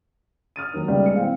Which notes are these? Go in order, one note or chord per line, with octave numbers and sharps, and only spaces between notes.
D#6 F6 A6 D#7
D#2 F#3
C#2 G3
B2 G#3 C#7
E3 C4 F5